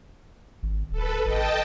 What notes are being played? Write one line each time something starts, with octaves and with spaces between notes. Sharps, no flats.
G#1
D1 A4 B4
G#1 D#5 G5 A5